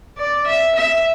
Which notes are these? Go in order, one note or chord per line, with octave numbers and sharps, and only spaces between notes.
D5
E5
E5